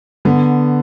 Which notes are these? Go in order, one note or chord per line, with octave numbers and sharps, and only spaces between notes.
D3 B3